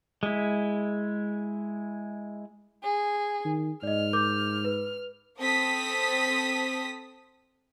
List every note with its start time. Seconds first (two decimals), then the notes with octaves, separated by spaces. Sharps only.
0.23 G#3 E4
2.83 G#4
3.45 D#3
3.83 G#2 D5 D#5 F6
4.13 A#4 D6 G6
4.65 B4
5.40 C4 A4 A5 D#6 B6